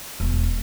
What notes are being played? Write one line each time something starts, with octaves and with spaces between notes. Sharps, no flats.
E1